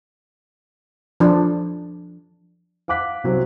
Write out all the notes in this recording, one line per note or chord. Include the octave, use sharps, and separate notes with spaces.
F3 D4
F5 F#5 D6 F#6 B6
C2 F#3 C4